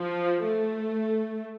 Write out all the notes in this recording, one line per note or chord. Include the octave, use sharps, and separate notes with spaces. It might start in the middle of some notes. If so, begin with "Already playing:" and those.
Already playing: F3
A3